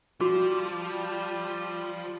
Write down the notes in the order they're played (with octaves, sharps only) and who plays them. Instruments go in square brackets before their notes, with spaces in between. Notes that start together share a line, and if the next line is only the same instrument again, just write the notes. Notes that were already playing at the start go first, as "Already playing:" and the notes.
[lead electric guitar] F3 [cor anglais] G3 [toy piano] F#4 D6